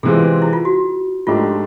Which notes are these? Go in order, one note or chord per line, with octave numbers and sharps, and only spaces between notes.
C3 E3 G#3 C4 F4 G#4
E4
F4
F#4
G#2 F3 A3 D4 F4 G4